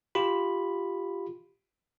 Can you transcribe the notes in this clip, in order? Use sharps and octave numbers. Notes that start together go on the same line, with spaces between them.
F4 G4 B5